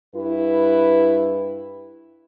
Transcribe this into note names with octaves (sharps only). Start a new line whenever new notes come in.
G2 E4 B4